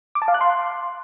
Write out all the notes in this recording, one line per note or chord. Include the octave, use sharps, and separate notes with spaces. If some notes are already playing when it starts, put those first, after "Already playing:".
D6
A5
F5
F#6
C6